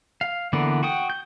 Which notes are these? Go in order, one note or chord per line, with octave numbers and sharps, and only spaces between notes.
F5
D3 E3 A#3 B3 D5
F#4 G5 D#6
G6